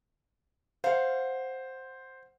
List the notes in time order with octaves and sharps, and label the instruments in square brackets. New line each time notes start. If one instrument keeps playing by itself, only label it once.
[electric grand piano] C5 [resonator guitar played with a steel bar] F5 F#5